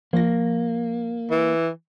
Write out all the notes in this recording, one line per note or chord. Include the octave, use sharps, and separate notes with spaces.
F3 A#3 A#6
E3